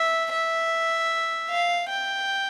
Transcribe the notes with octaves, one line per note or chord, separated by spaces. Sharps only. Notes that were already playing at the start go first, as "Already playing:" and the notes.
Already playing: E5
E5
F5
G5